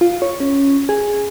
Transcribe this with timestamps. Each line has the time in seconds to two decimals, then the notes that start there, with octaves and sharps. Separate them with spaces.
0.01 F4
0.22 C#5
0.40 C#4
0.89 G#4